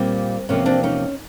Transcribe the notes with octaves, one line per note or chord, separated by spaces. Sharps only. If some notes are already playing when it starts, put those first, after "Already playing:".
Already playing: A#2 G3 A#3 C4
E2 C3 F3 A#3 B3 C#4
C4 D4
C#4 D#4